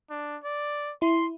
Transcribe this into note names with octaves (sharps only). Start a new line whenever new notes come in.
D4
D5
E4 C6